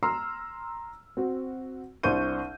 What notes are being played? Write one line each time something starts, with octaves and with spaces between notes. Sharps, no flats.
A#5 C6 E6 F6 C7
C4 F#4
C2 D4 C5 C#6 G6 D#7